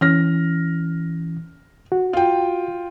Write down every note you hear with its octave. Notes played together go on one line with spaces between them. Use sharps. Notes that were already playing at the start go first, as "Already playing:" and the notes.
E3 C#4 F6 A#6
F#4
F4 G5